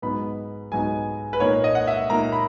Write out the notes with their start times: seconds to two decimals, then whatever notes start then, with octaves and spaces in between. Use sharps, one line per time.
0.02 G#2 F#3 B3 D#4 B5
0.71 G#2 F#3 B3 D#4 G#5
1.33 B4
1.40 A#2 A#3 D#4 C#5
1.64 D#5
1.75 F#5
1.87 E5
2.10 A#2 A#3 D#4 A#5
2.32 B5